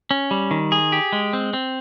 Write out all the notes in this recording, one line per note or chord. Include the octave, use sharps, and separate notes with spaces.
C#4
G3
D#3
G#4
G4
G#3
C4
C4